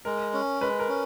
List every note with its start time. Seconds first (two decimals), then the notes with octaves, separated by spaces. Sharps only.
0.05 G#3 A#4
0.33 C#4
0.61 G#3 B4
0.79 A#4
0.89 C#4